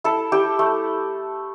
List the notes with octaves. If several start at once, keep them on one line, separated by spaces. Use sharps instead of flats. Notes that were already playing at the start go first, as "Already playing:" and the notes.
E4 A4
E4 G4
A3